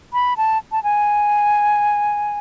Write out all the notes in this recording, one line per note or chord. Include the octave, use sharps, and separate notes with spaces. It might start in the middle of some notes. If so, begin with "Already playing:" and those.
B5
A5
A5
G#5